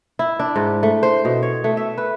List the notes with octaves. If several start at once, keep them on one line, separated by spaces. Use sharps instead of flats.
E4
D4
G#2
A3
C5
B2
C#5
A3
E5
B4